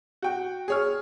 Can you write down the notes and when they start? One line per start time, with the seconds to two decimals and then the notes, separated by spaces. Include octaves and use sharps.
0.22 F#4 G5
0.68 G#4 C#5 F6